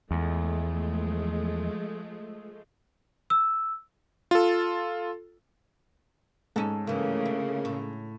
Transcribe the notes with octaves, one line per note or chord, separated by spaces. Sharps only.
E2 F3 G#3 A3
E6
F4 A4
G#2 C#4 A4
G2 C#3 E3 A3 A#3
E4
A2